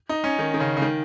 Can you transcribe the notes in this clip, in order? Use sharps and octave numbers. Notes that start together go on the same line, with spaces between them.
D#4
C#4
D#3
D#3
C#3
C#3
D#3